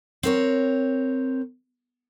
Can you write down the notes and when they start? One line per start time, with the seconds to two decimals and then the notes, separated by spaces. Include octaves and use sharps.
0.23 C4 A#4 C#5